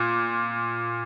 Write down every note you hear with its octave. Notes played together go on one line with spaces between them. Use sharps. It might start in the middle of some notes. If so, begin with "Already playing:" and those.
Already playing: A#2